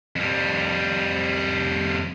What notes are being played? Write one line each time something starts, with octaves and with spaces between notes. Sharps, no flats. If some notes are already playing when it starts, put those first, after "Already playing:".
F2 G3